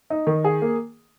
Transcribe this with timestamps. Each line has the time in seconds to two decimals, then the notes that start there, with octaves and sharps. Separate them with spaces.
0.10 D#4
0.27 D#3
0.44 G#4
0.62 A#3